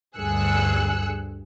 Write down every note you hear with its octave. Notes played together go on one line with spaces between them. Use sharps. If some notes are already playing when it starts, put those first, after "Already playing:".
D2 G2 G#4 E6 F#6 C#7